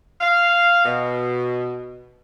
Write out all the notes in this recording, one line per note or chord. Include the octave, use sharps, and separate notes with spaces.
F5
B2